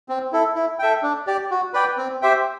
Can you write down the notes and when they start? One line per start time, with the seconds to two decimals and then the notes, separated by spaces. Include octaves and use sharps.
0.09 C4
0.33 E4 A4
0.56 E4
0.79 A4 E5 G5
1.03 D4
1.27 G4 D5
1.51 F#4
1.74 B4 D5 G5
1.98 C4
2.22 G4 C5 E5 G5